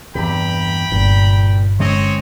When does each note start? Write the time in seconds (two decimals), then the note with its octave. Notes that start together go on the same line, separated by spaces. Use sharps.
0.15 E2 G2 C3 G5 A#5 B5
0.92 G1 A#2
1.79 D3 G#3 C4 C#4 C#5 D#5